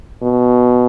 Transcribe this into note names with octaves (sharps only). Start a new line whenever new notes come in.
B2